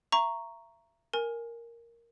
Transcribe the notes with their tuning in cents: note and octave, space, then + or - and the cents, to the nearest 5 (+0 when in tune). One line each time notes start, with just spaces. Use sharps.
E5 +35 A#5 +0 C#6 +0
A#4 +0 G#5 +0